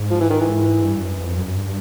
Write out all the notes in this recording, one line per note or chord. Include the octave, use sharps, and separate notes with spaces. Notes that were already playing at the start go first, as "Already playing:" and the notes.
Already playing: G#2
F3
E3
D#3
E3
G2
F#2
F2
F#2
F#2
G2